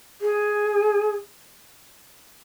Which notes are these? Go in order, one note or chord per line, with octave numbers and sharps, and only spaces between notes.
G#4